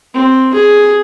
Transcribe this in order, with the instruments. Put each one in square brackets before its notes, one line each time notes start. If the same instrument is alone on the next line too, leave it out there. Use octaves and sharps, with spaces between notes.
[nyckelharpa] C4
G#4